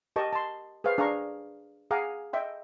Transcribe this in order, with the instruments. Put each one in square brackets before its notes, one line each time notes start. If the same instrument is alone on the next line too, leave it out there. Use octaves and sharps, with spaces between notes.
[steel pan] G4 A#4 D#5 A5 C#6
A5 C6
G#4 B4 C5 F5 C#6
D4 G#4 F5 A#5 C#6
G#4 F5 F#5 G#5 A#5 D6
D#5 E5 G5 C6